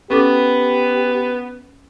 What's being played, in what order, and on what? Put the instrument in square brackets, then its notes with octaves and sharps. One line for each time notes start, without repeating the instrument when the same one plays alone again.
[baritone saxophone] B3 [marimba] C#4 A4 D6 [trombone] G4